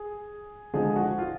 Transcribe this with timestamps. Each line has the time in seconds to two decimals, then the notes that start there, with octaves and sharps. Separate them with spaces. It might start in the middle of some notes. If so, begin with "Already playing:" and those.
Already playing: G#4
0.73 D3 F3 G#3 G#4
0.96 F#4
1.18 F4